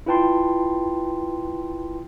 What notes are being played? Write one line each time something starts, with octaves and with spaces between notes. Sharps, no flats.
E4 F4 B4 G5 A5 C6